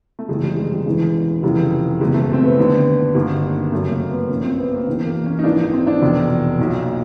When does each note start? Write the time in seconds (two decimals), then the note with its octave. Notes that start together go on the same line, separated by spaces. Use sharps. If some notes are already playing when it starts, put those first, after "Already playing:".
0.19 A3
0.29 F#1 E2 C3 D#3 G#3
0.43 G3
0.57 G#3
0.72 G3
0.86 E1 E2 C#3 E3 G#3
1.43 F1 E2 C#3 E3 G3
2.01 F#1 E2 B2 G#3
2.14 A3
2.33 C4
2.43 B3
2.57 D#2 D3 B3
3.15 G#1 G2 D3 A#3
3.72 F#1 F#2 D#3 A3
3.91 A#3
4.11 B3
4.29 A#1 C#4
4.35 A#2
4.44 C4
4.58 B3
4.72 A#3
4.87 E1 E2 B2
5.05 A#3
5.26 C#4
5.39 D#4
5.44 A#1 G#2 E3 D4
5.59 D#4
5.73 C4
5.87 D4
6.02 F1 E2 B2
6.59 B1 A#2